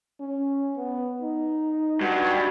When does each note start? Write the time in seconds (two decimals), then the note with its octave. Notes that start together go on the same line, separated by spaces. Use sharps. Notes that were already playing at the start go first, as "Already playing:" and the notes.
0.20 C#4
0.77 B3
1.21 D#4
2.01 G2 F#4